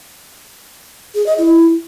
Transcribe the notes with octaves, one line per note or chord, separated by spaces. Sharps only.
G#4
D#5
E4